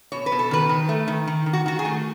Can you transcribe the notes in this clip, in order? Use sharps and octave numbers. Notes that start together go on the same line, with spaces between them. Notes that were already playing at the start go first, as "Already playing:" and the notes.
B2 C#5
B4
B2
A4
D#3 B4
D#3
A3
D#3
D#3
D#3
F#4
D#3 F#4
G#4
A3